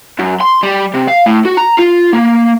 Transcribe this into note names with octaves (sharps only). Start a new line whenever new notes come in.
F#2
C6
G3
C3
F5
A2
F#4
A#5
F4
A#3